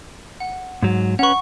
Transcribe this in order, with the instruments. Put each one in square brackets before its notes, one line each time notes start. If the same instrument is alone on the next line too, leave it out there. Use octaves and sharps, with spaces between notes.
[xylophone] F#5
[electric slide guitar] G#2 F#3
[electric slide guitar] C#4 B4 [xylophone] F#5 C#6